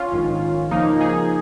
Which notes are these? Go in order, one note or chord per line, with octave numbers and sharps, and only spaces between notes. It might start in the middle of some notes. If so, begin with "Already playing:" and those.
Already playing: C#4 F4
A#1 G#2 D#3
C#2 C#3 F3 A#3 D#4
D#4 G#4